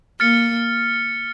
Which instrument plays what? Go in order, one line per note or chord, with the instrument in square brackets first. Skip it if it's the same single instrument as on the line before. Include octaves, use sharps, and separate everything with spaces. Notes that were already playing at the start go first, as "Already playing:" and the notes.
[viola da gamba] A#3 [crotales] F6 A6 C#7